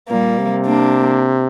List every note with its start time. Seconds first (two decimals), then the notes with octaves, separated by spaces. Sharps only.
0.10 A#2 G3 A#3
0.38 C3
0.67 A#3 D4